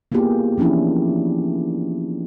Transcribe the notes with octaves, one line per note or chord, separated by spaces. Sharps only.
A#3 B3 E4 F4 G4 G#4
E3 F3 C#4 D4 E4